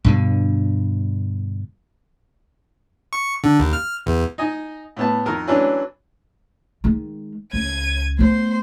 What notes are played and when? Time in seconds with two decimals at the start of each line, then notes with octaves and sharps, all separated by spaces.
0.05 G2 B2 D3
3.13 C#6
3.44 D3
3.59 D#2
3.73 F6
4.06 E2
4.38 D#4 D#5 G#5
4.97 A2 B3 A5
5.25 F2 D#3 A#4
5.47 E3 F#3 C#4 D4
6.84 D#3 G#3
7.53 C#2 G#6 D#7
8.19 A3 B3 C5 C6